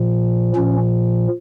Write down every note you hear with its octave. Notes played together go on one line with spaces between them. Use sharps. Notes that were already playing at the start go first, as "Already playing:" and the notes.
Already playing: A#2 F3
A#2 F3 C#4